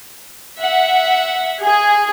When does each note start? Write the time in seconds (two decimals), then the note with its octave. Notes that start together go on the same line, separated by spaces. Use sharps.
0.61 E5 F#5
1.65 G#4